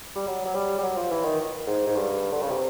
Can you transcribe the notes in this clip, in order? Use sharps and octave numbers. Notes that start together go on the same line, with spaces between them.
G3
F#3
F#3
G3
G3
F#3
F3
E3
D#3
G#2
G#2
G2
D3
C#3
C3